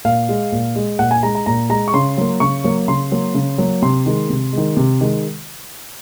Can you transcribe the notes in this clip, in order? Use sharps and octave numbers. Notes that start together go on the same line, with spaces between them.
A#2 F5
G#3
A#2
G#3
A#2 F#5
G#5
G#3 A#5
A#5
A#2 A#5
G#3 A#5
C#6
C#3 C6
F#3 A#3
C#3 C#6
F#3 A#3
C#3 C6
F#3 A#3
C#3
F#3 A#3
C3 C6
D#3 G#3
C3
D#3 G#3
C3
D#3 G#3